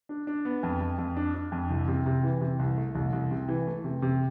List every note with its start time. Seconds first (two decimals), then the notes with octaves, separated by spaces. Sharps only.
0.09 D4
0.27 D4
0.45 B3
0.63 F2
0.81 F2
0.98 F2
1.17 D4
1.34 D4
1.52 F2
1.70 C2
1.88 C3
2.06 C3
2.23 E3
2.41 C3
2.59 C2
2.77 A3
2.95 C2
3.13 C2
3.31 C3
3.49 E3
3.67 A3
3.84 C3
4.02 C3